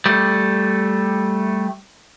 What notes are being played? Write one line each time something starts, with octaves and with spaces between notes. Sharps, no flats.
G3 A3